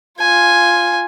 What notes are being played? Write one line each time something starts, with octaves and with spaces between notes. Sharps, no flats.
F4 G#5